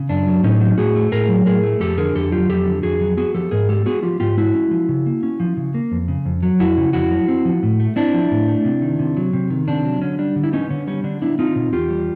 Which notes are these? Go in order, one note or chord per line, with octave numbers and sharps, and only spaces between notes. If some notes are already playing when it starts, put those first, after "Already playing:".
Already playing: C#3
F#2 D4
F#3
A2 C#4 D#4
F#3
A2 F#4 G#4
A3
A2 G#4 A#4
F#3
A2 G#4 A#4
A3
F2 G4 A4
D3 G#4 A#4
F2 G4 A4
F#3 F4 G4
F2 G4 A4
D3
F2 F#4 G#4
F#3
B3 F#4 G#4
F3 G4 A4
G#2 G#4 A#4
G#3 G4 A4
B3 F#4 G#4
F3 F4 G4
G#2 F4 G4
G#3 E4 F#4
C#4
F3
C#3
A#3
C#4
F3
C#3
A#3
F2
C#3
F2
F#3
F2 E4 F#4
C#3
F2 E4 F#4
F#3
C4
F3
A2
A3
C4 D4 E4
F3
A2
A3
C3
D#3
C3
F#3
C3
D#3
C3 D4
F#3
D3 C#4
G3 D4
D3
E4
B3 C#4 D#4
D3 C#4
G3 C#4
D3 D4
B3 D4 E4
C4 D#4 F4
B2
E2 F4 G4
G3